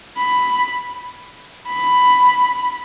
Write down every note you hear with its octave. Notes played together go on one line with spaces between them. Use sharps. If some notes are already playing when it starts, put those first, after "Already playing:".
B5
B5